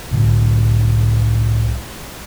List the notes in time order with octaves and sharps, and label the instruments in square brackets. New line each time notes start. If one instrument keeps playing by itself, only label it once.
[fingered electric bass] C2 A2 D3 F#3